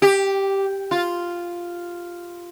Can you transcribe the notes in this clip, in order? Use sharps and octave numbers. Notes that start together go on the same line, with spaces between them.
G4
F4